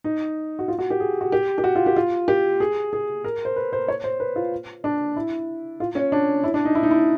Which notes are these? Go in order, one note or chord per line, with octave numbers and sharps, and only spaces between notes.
D#4
F#4
F4
F#4
G4
G#4
F#4
G4
G4
F#4
F4
G4
F4
G4
G#4
G#4
A#4
C5
B4
C5
C#5
C5
B4
F4
D4
E4
F4
C#4
D4
E4
D4
D#4
E4
D#4
E4